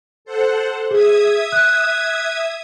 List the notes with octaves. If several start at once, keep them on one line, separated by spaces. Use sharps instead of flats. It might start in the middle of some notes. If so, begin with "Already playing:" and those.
A4 C5 F#5
G#4 E5 D#6 G#6
F#6